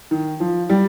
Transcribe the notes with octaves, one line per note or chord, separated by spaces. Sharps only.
D#3
F3
G3